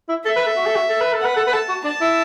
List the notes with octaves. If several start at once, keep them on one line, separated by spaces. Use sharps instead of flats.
E4
A4 E5
B4
A4
F#4
A4
F#4
A4
B4
A4
B4 F#5
A4
B4
A4 A5
F#4
D4 A5
E4